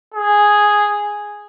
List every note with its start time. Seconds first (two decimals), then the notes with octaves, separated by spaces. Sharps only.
0.14 G#4